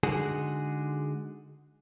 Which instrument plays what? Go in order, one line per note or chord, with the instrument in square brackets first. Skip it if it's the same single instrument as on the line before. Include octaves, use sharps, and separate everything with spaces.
[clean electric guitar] D3 G#3 D#4 F#4 G#4